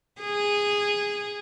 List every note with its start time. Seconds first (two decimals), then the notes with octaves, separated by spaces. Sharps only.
0.21 G#4